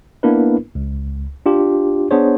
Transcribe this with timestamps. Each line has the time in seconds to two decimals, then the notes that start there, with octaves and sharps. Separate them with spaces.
0.23 A#3 B3 D4 E4 A#4 B4
0.75 C#2
1.46 D4 F4 G4
2.11 B3 D4 G#4 C5 C#5